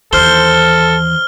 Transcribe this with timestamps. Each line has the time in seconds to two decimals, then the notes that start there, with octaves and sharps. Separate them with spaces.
0.13 D#2 E3 A4 C5 F6 G7